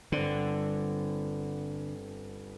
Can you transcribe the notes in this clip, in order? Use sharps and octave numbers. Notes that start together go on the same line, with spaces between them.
G1 D3 C4